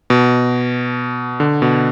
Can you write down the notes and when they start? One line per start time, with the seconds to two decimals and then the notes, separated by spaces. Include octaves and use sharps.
0.10 B2
1.40 D3
1.62 B2